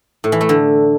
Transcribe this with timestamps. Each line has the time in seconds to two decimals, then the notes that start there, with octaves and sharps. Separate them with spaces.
0.24 A2
0.32 E3
0.41 A3
0.49 D3